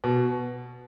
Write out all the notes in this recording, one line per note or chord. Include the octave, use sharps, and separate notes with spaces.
B2